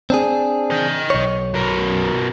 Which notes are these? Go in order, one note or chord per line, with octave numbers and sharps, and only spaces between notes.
C4 D4 G#4
D#5 G5
B1 C#5
B2 A#4